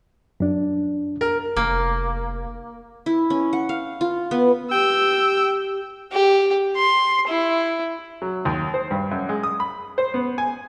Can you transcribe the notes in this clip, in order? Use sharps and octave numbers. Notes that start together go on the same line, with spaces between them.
F#2 D4
A#4
F1 A#3
E4
C#4
F#5
F5
F4
B3
G4 G5 E6
G4
C6
E4
F#3
D#2
C5
G2
F#2
G#3
D#6
B5
C5
B3
G#5